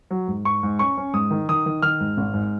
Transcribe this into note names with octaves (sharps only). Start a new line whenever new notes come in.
F#3
G#2
G#2 C#6
G#2
C#4 C#6
C#4
G#2 D#6
D#3
D#3 D#6
D#3
D#3 F6
G#2
G#1
G#2